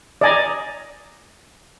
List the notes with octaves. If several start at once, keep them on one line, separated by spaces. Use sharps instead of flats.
D5 D#5 G#5 A#5